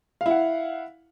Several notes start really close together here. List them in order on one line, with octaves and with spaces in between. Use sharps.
F5 E4 F#5